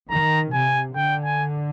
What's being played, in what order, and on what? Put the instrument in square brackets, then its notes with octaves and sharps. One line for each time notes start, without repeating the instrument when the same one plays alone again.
[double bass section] D#3 [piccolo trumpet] A#5
[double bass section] C3 [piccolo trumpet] G#5
[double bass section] D3 [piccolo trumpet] G5
[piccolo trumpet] G#5